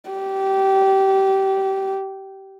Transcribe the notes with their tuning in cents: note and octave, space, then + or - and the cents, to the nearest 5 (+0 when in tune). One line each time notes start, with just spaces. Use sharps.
G4 -20